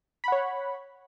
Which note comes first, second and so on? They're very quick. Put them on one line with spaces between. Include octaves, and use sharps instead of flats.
B5 F#5 C#5